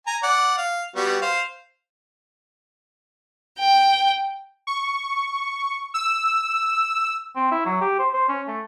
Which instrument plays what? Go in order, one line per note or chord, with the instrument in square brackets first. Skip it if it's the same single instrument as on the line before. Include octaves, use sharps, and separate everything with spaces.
[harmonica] G#5 A#5
D5 F#5
F5
G3 B3 F#4
C5 F5
[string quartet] G5
[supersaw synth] C#6
E6
[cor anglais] C4
E4
F#3
G4
C5
C5
C#4
A3